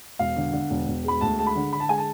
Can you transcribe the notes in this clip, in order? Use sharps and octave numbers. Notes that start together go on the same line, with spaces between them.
E1 F5
D3
D3
E1
E1
G#3 B5
D2 A5
G#3 A5
B5
D3
D3 B5
A5
G#3 G#5
A5